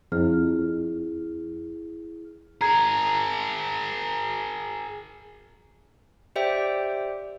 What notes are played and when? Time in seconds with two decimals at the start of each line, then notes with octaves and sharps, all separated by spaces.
0.12 F2 E4 G#4 F6
2.61 G#4 A#4 A#5 G#6
6.36 G4 C5 D5 E5 G5